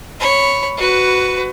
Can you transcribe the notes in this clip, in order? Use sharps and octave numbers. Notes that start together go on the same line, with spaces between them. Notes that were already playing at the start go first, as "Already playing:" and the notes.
C#5 B5
F#4 B4